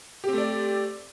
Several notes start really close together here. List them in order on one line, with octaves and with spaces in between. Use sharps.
G4 C4 A3 D5